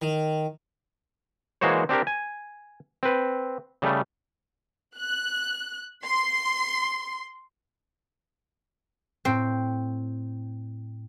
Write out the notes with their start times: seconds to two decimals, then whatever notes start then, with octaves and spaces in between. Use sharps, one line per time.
0.02 D#3
1.61 E3 G#3 A#3 F#4 C5 C#5
1.89 C4 D4 G4 A#4
2.07 G#5
3.03 C4 B4
3.82 C#3 G3 A3
4.98 F#6
6.05 C6
9.25 A2 C4 G5 C7